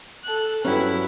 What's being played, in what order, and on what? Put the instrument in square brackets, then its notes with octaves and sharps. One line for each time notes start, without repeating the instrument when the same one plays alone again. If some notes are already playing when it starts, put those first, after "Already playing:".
[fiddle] A4 F#6
[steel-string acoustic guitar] G2 F#3 C#4 [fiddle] E4